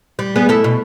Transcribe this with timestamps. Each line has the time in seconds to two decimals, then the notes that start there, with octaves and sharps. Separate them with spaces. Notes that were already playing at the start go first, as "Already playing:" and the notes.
0.19 G3
0.36 G3 B3 G#4
0.49 E4 A4
0.64 B2